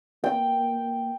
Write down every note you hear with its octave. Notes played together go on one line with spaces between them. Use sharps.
A#3 G5